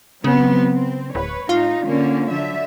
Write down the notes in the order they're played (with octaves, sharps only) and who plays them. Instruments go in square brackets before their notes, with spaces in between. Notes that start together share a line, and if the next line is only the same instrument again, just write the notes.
[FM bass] C#3 [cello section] F#3 B3 C4
[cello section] C4
[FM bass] D1 [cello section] B4 C#5
[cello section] A2 D#4 [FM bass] F4
[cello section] D3 A#3 C#4
D3 F#3 E5